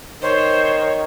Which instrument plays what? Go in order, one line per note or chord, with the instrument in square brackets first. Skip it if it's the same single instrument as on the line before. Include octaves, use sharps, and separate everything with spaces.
[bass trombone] D#3 [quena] C5 [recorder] C#5